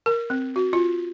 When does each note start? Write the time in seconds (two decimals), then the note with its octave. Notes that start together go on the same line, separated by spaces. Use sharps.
0.06 A#4
0.30 C4
0.56 F#4
0.73 F4